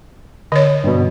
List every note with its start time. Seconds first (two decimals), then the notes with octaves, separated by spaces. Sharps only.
0.52 D3 C#5 D#5
0.84 G2 B2